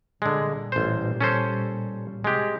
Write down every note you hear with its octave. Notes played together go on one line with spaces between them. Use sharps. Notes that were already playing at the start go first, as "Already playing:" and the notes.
A#2 D3 G3 G#3
A1 C5
C#4 A4 C5
C3 G#3 G4